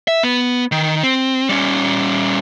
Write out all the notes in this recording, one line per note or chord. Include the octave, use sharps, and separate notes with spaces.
E5
B3
D#3
C4
G3 C#4